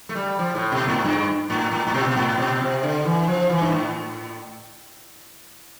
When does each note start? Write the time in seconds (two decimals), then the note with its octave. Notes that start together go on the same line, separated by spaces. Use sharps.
0.09 A3
0.15 G3
0.39 F3
0.55 A2
0.72 B2
0.88 A2
1.04 G2
1.50 A2
1.72 A2
1.87 A2
1.94 B2
2.16 A2
2.38 B2
2.60 C3
2.83 D3
3.05 E3
3.27 F3
3.49 E3
3.61 G2
3.72 A2